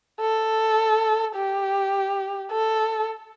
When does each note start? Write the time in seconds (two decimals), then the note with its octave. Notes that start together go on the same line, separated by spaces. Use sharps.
0.21 A4
1.36 G4
2.52 A4